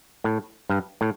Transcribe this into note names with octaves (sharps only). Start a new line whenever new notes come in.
A2
G2
A2